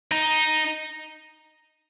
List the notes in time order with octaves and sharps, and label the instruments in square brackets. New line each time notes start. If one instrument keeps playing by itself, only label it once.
[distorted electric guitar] D#4